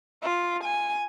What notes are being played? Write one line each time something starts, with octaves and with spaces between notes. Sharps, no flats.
F4
G#5